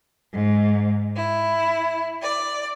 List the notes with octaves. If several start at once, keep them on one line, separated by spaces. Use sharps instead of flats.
G#2
E4
D5